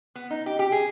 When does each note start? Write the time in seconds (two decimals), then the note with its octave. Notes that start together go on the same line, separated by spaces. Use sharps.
0.15 B3
0.31 D#4
0.46 G4
0.59 G4
0.72 G#4